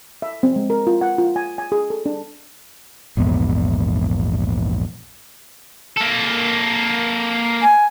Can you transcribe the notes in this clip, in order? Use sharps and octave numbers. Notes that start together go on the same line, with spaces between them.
E5
C4
G#3
A#4
F4
F#5
F4
G#5
G#5
G#4
A4
D4
A#1 E2 G#2 B3
A#3 A4
G#5